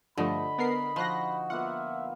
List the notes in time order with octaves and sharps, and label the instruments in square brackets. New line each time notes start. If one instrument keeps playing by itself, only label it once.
[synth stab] G2 F3 A3 [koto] D3 [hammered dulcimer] D#5 [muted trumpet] B5
[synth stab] B3 A#4 C7
[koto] F3 [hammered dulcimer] D#4 F#4 [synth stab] C6 F#6 A#6
[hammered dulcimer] A#3 B3 F4 [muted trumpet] E5 [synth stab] F#5